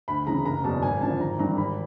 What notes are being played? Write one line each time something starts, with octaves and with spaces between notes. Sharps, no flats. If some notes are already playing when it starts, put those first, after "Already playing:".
D2 B5
C#3 E3 A#5
F#1 A#5
E2 B2 F#3 A5
G#1 G#5
F#2 D3 F3 A5
G#1 A#5
G2 E3 A#5
G#1 B5